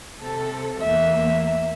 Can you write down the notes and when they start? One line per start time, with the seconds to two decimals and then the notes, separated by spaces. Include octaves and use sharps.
0.22 C3 A4
0.81 E2 A#3 E5